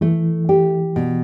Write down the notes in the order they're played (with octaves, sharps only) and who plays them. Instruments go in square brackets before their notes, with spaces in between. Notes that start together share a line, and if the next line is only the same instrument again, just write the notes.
[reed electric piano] E3 [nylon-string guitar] A3
[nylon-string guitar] G4
B2